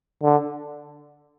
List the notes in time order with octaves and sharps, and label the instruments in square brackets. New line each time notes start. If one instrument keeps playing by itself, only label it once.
[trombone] D3